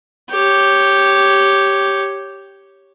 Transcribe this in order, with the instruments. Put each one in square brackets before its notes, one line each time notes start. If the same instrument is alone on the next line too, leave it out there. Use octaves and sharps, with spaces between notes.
[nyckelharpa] G4 C#5